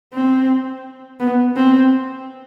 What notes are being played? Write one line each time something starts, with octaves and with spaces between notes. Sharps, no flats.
C4
B3
C4